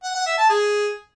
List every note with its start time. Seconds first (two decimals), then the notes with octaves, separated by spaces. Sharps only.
0.03 F#5
0.15 F#5
0.26 E5
0.38 A5
0.50 G#4